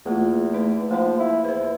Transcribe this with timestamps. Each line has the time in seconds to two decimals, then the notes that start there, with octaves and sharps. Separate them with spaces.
0.05 E2 A3 A#3 F4
0.54 A3 D#4 B4
0.91 F3 A#3 D#4
1.19 E4
1.44 E2 B4 C5